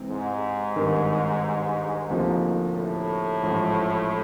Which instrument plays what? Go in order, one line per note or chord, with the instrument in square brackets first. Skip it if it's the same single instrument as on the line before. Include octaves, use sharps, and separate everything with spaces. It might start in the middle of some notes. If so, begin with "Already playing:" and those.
Already playing: [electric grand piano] C3 E3 G#3 C4
[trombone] G#2
[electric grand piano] G#1 G2 D#3
D2 C3 F3 A#3 D#4
[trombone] A2
[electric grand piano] A1 G#2 F3